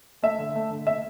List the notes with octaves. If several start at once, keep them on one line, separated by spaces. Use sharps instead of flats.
A3 E5
D3
A3
D3
A3 E5